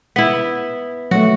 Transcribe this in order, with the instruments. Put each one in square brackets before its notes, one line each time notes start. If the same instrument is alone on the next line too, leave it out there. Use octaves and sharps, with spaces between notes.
[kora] B3 E4 [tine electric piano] B6
[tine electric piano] F#3 A3 [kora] F#4